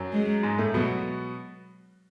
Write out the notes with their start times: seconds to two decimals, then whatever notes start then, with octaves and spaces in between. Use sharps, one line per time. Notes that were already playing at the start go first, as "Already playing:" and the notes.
Already playing: F#2 F#3
0.13 G#3
0.43 G#2 G#3
0.58 A2 A3
0.74 B2 F#3 B3